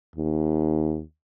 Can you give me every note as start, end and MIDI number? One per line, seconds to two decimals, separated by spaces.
0.16 1.02 39